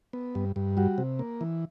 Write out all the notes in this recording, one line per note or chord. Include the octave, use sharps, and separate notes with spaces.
B3
G2
G2
G3 F#4
C3
A#3
E3